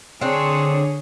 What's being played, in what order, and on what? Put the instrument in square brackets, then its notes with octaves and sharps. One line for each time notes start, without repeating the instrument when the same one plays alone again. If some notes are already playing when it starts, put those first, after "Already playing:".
[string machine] D3 [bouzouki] C4 D4 [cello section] G#4 C#5